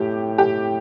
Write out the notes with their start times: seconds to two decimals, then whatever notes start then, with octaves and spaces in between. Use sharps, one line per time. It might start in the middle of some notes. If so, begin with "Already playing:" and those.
Already playing: A2 G4
0.38 G4